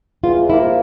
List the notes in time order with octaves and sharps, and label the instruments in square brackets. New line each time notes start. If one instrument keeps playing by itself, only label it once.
[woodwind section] E2 [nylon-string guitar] F4
[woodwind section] C3 F3 A#3 [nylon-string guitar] E4